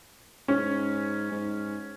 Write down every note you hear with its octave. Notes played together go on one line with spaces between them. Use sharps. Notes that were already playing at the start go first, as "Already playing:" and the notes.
G#2 C#4
G#2